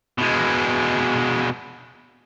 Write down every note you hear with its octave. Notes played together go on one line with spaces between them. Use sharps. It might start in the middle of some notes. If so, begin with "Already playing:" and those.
B2 G#3